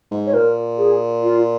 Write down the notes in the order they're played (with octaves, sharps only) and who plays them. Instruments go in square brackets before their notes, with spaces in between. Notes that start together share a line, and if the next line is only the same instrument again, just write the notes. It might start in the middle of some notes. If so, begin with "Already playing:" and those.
[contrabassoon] G#2
[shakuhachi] C#5
[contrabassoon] A#2 [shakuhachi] A#4
[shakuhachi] G#4
F4